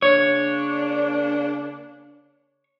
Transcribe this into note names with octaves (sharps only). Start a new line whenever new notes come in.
C#3 A#3 D4 C#5